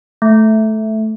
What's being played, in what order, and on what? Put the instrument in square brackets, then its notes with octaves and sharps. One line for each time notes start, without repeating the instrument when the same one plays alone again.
[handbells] A3